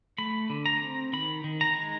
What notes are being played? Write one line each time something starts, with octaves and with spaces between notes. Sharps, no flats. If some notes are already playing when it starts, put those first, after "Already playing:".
A3 B5
D3
A#5
C4
D#3 B5
D#3
A#5
G#3